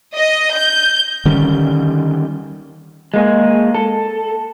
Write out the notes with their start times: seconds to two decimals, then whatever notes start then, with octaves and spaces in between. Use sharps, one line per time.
0.14 D#5
0.55 G6
1.25 D3 D#3 G3 C#4
3.14 G#3 A#3 G#4
3.75 A4